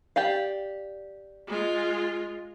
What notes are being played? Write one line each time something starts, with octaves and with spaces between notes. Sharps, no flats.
G4 D5 F5
G#3 F4